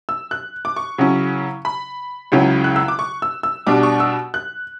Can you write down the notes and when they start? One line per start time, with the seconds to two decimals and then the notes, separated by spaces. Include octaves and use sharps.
0.09 E6
0.31 F#6
0.65 D6
0.76 C#6
0.98 C#3 F#3 C#4 E4
1.65 B5
2.32 C#2 C#3 F#3 C#4 E4
2.64 F#6
2.76 E6
2.88 D6
2.99 C#6
3.22 E6
3.43 E6
3.67 B2 G3 D4 D6
3.83 C#6
4.00 E6
4.34 F#6